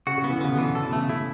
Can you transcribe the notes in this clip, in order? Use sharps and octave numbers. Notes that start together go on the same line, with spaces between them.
C#3 F#4
C#3
B3
E3
D3
C#3 B3
B2 D3
E3
C#3 A4
B2
C#3 A3
C#3 E4